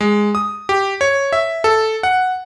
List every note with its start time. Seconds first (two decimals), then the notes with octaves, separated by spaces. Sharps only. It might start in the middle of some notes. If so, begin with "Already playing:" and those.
0.01 G#3
0.35 D#6
0.69 G4
1.01 C#5
1.33 E5
1.64 A4
2.03 F#5